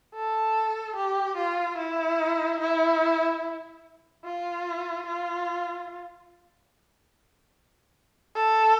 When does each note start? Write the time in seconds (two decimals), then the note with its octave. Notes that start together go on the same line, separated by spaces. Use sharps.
0.14 A4
0.95 G4
1.37 F4
1.77 E4
2.60 E4
4.24 F4
5.06 F4
8.35 A4